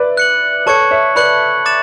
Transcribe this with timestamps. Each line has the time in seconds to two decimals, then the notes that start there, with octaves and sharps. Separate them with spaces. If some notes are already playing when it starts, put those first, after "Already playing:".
Already playing: B4 D5 E5
0.17 F#6 C#7 F#7
0.66 A4 C#5 A5 C#6 G#6 C#7
0.91 C#5 E5
1.15 B4 D5 B5 F#6 C#7 F#7
1.66 D6 A6 E7